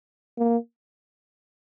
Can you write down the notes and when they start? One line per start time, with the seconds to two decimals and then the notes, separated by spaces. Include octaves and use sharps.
0.38 A#3